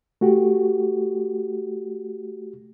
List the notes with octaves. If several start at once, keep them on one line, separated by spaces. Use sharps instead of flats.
A3 F#4 G4